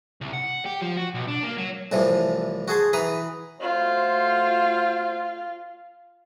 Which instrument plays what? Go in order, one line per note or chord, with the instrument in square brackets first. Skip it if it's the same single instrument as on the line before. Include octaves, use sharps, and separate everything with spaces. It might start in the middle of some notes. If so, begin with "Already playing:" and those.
[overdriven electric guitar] C2
F#5
G4
F3
F#4
B1
D4
A#3
F#3
[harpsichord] C2 A2 C3 E3 F3
F#4 G#4 A5 C6
E3 B4 A#5 B5 D#6
[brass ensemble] A3 F#4 C5 [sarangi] F4